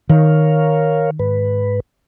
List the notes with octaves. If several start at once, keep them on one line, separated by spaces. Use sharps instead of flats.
D#3 A#4 C#5 F5
G#2 B4